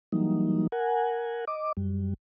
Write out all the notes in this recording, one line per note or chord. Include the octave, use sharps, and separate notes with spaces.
E3 F#3 G3 A#3 D#4
A#4 F#5 G#5
D#5 D6
F#2 G3